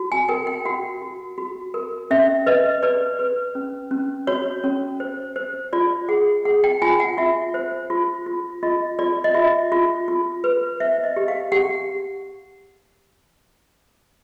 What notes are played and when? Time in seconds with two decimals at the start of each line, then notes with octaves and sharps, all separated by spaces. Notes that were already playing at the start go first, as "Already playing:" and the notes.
Already playing: F#4
0.12 G#5
0.29 A#4 G5
0.47 G5
0.65 F#4 F#5
1.02 F#4
1.38 F#4
1.74 A#4
2.11 C#4 E5
2.46 B4 D#5
2.83 B4 D5
3.19 B4
3.55 C#4
3.91 C#4
4.27 F#4 C#5
4.64 C#4
5.00 C5
5.36 C5
5.73 F4 D5
6.08 G#4 F#5
6.45 G#4 F#5
6.64 G5
6.82 F4 G#5
7.00 F#5
7.18 F4 E5
7.54 C5
7.90 F4
8.26 F4
8.63 F4 D#5
8.99 F4 D5
9.24 D#5
9.34 F4 E5
9.72 F4
10.08 F4
10.44 B4
10.80 C5 E5
11.04 D#5
11.16 G4
11.28 F5
11.52 G4 F#5